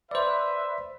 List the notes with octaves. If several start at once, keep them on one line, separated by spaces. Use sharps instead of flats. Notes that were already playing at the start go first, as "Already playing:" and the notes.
B4 C5 D5 E5